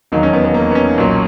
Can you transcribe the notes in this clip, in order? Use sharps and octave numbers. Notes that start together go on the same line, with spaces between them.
E1 D#2 D#3 F#3 D#4
C#4
B3
B3
A#3
B3
C#4
B1 A#2 F#3